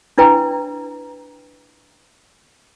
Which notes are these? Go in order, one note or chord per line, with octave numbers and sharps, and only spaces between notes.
D4 E4 B4 G5 A#5